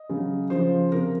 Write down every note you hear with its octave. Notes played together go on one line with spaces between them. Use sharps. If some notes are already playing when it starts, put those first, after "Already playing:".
Already playing: D#5
C#3 F#3
C#3 F3 C5
C3 F3 A#4